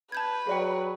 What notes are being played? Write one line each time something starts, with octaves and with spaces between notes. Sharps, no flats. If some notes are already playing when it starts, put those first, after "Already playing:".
B4 A5 G6 G#6
F#3 G#4 D5 G5